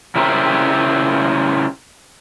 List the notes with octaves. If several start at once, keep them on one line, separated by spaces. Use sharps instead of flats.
C#3 E4 G4 A#4 C5